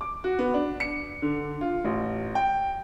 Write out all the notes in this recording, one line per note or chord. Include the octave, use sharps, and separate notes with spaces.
D6
F#4
B3
D4
C#7
D3
F4
A1
G5